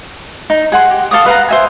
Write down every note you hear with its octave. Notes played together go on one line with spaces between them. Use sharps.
D#4
G#4 F#5 C6
G4
A4 F5 D6 D#6
B4 F5 F#5 A#5
C5 E5 G#5